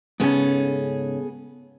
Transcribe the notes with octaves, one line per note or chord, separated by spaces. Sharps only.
G#2 C#3 B3 C#4 G#4 A4